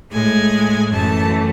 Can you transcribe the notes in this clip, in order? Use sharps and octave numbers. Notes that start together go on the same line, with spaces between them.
A2 G#3 G#5
F#2 E3 A3 A5